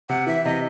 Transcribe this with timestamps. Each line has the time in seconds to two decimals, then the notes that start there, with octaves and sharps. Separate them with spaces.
0.09 C3 F#5
0.27 E3 E5
0.45 C3 D#5